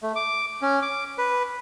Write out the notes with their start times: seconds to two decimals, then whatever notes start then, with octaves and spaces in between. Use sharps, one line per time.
0.03 A3
0.16 D6
0.62 C#4
0.82 D6
1.18 B4